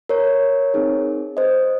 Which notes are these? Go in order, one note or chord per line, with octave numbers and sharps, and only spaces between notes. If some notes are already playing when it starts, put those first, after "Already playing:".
A#4 C#5
C4 D#4 G#4
C5 D#5